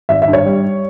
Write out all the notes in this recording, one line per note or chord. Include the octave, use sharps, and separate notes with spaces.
G#1 E5
E5
G2
C#5
G3